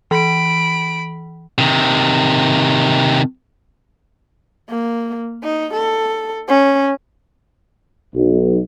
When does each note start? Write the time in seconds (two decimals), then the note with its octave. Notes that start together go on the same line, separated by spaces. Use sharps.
0.11 E3 B5 D7
1.58 C3 D#3
4.70 A#3
5.43 D#4
5.74 A4
6.48 C#4
8.14 B1